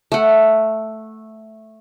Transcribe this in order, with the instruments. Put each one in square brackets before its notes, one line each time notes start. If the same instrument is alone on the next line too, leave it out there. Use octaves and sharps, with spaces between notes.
[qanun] A3 F#5